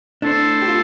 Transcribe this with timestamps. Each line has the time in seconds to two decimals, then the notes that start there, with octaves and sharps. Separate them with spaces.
0.22 A3 D4 E4 A4 C5
0.62 G4
0.68 F4